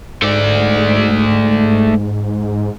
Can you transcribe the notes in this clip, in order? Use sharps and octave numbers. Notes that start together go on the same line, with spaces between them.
G#2 A3 D5